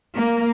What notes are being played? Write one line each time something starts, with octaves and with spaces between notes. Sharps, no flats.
A#3